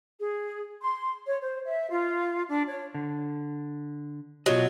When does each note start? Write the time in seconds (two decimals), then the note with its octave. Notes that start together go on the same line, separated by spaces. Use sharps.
0.20 G#4
0.81 C6
1.26 C#5
1.42 C5
1.65 E5
1.90 F4
2.48 D4
2.69 C#5
2.94 D3
4.46 B2 F#3 F4 D#5